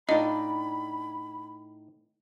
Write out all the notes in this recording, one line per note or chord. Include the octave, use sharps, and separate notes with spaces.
A2 D4 D#4 F4 D5 D#5 B5